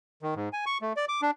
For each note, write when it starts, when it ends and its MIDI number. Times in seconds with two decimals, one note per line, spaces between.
0.22 0.34 51
0.36 0.49 44
0.53 0.65 80
0.66 0.78 85
0.82 0.93 57
0.97 1.05 74
1.09 1.21 86
1.22 1.31 62